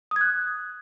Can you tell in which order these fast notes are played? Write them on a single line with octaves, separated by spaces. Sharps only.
D#6 G#6 F#6